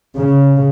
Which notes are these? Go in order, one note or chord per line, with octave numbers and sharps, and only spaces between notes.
C#3